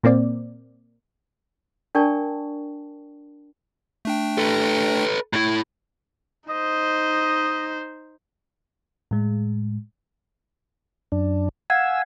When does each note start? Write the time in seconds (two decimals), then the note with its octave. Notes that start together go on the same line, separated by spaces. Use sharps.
0.03 A#2 A#3 C4 D5
1.95 D4 A#4 D5 G5 A5 C#6
4.05 A3 D4 G5
4.38 A4 B4
5.33 A2 E4
6.49 D#4 C5 D#5
9.11 A2 G#3
11.12 F#2 D4
11.70 F5 F#5 G#5 E6 G#6